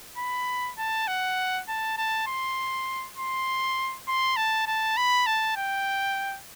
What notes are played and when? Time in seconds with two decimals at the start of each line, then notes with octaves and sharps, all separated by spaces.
0.18 B5
0.78 A5
1.08 F#5
1.68 A5
1.98 A5
2.27 C6
3.18 C6
4.08 C6
4.37 A5
4.67 A5
4.97 B5
5.27 A5
5.57 G5